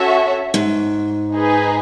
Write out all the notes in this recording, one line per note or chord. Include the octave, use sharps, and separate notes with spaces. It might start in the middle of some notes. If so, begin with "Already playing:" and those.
Already playing: C#4 F#4 A4 C#5 E5
G#2
D#4 G#4 B4